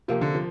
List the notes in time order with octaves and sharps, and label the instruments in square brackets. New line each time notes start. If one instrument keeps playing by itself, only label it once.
[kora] C3 A#3 D4 G4 [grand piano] F3
[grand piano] D3
F3